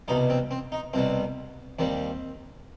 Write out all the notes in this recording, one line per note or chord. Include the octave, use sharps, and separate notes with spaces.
C2 B2 G3 D#4
C4
C4
D#4
C2 B2 G3 C4
D#2 D#3 G3 C4